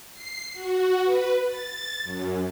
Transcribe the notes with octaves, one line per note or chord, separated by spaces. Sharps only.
C7
F#4
B4
A6
F#2